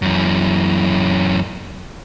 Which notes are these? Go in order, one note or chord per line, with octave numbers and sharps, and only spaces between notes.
F#2 E3